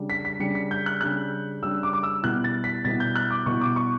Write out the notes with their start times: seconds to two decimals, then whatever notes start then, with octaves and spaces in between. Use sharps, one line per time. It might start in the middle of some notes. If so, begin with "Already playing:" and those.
Already playing: C#3 G3 D4
0.10 B6
0.25 B6
0.40 C#3 G3 D4 C#7
0.55 B6
0.71 G6
0.86 F#6
1.00 C#3 G3 D4 F#6
1.63 C#3 G3 D4 E6
1.83 D6
1.93 D6
2.03 E6
2.23 B2 G3 B3 E4 F#6
2.44 A6
2.64 B6
2.85 B2 G3 B3 E4 A6
3.00 G6
3.16 F#6
3.31 D6
3.46 B2 G3 B3 E4 C#6
3.61 D6
3.76 C#6